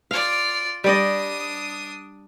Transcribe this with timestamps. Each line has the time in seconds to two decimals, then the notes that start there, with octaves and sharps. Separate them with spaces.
0.11 F4 D5 F5
0.84 G3 D4 D5 D#5 D#6